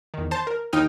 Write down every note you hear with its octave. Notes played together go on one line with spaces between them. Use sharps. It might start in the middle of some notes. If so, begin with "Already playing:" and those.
E2 D#3
C5 A5
A#4
D#2 D#4 G5 D#6 F6